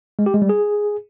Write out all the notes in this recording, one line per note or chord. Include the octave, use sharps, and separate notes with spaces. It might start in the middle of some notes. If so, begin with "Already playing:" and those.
G#3
G4
G#3
G3
G#4